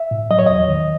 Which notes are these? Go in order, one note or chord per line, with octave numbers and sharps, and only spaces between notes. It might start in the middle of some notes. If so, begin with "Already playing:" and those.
Already playing: E5
A2
F#3 D#5
C#5
E2 D#5
D#3